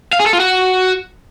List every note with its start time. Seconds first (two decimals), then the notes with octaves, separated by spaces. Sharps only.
0.13 F5
0.19 G#4
0.26 A4
0.33 F4
0.40 F#4